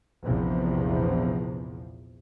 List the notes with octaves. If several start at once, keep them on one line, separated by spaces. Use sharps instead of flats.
A#1 E2 C3 F3